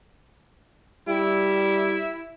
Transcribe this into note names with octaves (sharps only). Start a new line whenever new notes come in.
G3 E4